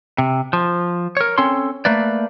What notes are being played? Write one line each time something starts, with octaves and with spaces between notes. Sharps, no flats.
C3
F3
A#4 C#5
C4 C#4 A4 C#5 C6
A3 A#3 B4 D5